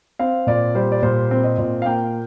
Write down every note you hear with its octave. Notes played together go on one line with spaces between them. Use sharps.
C4 F5
A#2 D5
G3 C5
D5
A#2 C5
C4
D#5
A#2
F5
A#3 G5